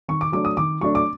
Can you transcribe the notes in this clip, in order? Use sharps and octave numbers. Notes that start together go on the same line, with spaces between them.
D#3 C#6
D6
F#3 A3 D4 D6
D#6
D#3 D6
F#3 A3 D4 C#6
D6